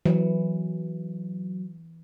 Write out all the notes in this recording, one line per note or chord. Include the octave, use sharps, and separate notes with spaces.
E3 F#3